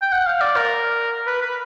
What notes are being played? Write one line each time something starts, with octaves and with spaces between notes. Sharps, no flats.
G5
F#5
F5
D5
A#4
B4
B4